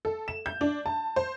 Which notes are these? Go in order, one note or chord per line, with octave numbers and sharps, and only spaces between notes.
A4
E7
G6
D4
A5
C5